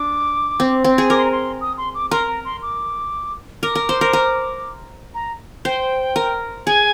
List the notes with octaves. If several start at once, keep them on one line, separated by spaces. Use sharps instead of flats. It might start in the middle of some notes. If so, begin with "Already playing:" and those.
Already playing: D4 D6
C4
C4
G#4
A#4 D6
C6
A#5
C6
D#6
C6
D6
A#4 C6
A#5
C6
D6
A#4 D6
A#4
C5
A#4
A#4
A#5
C5 G5
A#4
G#4 G#5